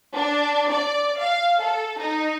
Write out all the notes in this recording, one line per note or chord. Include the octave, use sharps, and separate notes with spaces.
D4
D5
F5
A4
D#4